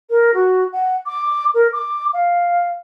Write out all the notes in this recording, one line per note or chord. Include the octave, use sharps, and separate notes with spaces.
A#4
F#4
F#5
D6
A#4
D6
F5